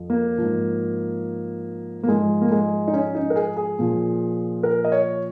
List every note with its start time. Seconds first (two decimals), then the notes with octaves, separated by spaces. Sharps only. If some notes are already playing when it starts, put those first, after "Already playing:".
Already playing: F2 F3
0.10 A#3
0.38 G#2 F3
2.04 A#3
2.08 G#2 F3 G#3
2.42 A#3
2.51 G#3
2.88 D#4
2.93 C#4
3.15 D#4
3.30 A#4
3.36 G#4
3.57 G#4
3.79 A#2 F3
4.63 A#4
4.84 D#5
4.92 C#5